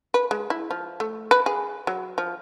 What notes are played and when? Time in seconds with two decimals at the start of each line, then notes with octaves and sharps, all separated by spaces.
0.14 B4
0.31 G#3
0.50 E4
0.71 F3
1.00 A3
1.31 B4
1.46 G#4
1.87 F#3
2.18 F3